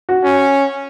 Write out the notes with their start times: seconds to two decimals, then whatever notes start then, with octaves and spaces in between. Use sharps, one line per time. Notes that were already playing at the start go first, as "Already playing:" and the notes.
0.09 F#4
0.24 C#4